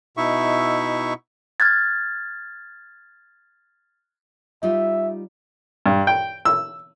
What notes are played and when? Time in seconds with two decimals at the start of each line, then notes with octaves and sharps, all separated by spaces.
0.17 B2 D#4 E4 E5 C#6
1.60 F6 F#6 G#6 A6
4.63 G3 D#4 F4 E5
5.86 G2
6.07 G5
6.45 E6